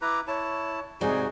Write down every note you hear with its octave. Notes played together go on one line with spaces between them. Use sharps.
E4 B4 A#5 D6
E4 C#5 A5
G#2 C3 G3 D#4 F#4 G#4